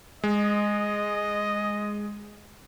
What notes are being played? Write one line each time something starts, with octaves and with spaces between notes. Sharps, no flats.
G#3 D#5